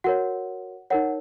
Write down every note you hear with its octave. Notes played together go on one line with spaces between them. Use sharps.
F#4 A#4 C#5 F#5
D#4 A#4 C#5 F#5